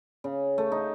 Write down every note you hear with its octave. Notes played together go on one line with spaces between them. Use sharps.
C#3
A3
D#4